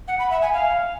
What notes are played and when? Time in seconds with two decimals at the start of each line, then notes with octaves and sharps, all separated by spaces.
0.07 F#5
0.19 B5
0.30 E5
0.42 G#5
0.53 F5